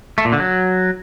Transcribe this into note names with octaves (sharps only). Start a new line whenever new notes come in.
A3
A#2
D3
F#3